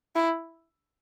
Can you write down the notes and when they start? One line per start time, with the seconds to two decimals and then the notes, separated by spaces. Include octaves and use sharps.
0.16 E4